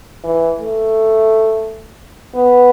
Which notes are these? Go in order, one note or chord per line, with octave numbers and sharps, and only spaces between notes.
E3
A3
B3